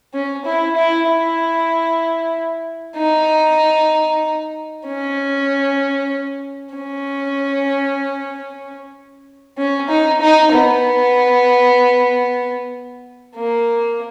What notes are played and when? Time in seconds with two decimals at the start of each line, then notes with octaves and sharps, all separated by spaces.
0.14 C#4
0.45 E4
0.76 E4
1.08 E4
2.97 D#4
4.86 C#4
6.74 C#4
9.58 C#4
9.89 D#4
10.21 D#4
10.52 B3
13.35 A#3